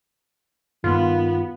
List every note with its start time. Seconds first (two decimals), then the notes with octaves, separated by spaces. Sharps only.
0.84 G2 D#3 B3 F4